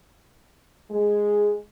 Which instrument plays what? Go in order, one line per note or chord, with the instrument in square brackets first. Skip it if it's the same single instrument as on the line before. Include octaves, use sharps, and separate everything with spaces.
[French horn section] G#3